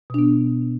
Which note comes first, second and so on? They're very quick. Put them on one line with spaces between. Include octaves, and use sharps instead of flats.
B2 D4 B3